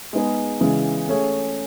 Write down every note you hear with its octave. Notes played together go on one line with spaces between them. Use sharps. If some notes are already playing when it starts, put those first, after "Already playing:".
G#3 B3 D#4 G#4
C#3 E3 G#3
A3 C#4 G#4 C#5